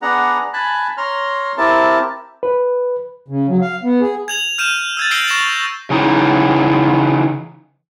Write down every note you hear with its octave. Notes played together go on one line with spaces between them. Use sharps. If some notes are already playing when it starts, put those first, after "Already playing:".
B3 D4 G#4 F#5 A#5
G#5 A5 B5 F#6
C#5 A#5 C6 F6
C4 E4 G4 A#4 A5
B4
C#3
F#3
F5
B3
G#4
G#6 F7 F#7
F6 G6 D#7 E7
E6 G#6 A6
E6 G6 A#6 C7 D7 G7
C#6 A#6 E7 F7
C#3 E3 D#4